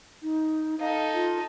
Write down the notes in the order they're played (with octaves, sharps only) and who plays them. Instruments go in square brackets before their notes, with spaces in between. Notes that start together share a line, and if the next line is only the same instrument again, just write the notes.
[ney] D#4
[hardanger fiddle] D#4 A4 [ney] F5
[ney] F4